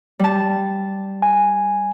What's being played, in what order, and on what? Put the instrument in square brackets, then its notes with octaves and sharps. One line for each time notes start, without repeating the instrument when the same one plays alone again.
[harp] G3 A5
[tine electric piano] G#5